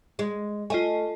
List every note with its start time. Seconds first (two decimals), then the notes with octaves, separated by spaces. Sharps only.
0.19 G#3
0.70 A3 F4 D#5 G#5